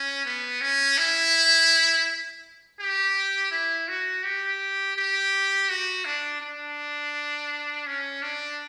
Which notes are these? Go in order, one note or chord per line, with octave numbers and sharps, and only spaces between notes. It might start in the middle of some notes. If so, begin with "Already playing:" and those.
Already playing: C#4
B3
C#4
E4
G4
E4
F#4
G4
G4
F#4
D4
D4
C#4
D4